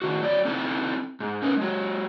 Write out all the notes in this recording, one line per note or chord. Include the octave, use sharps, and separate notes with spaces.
A2 D#3 F#4
F#3 D5
C4 D#4 E4 A4 G5
G#2
C#4 A#4 B4
F#3 G#3